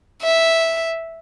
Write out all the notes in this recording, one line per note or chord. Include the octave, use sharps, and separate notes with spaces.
E5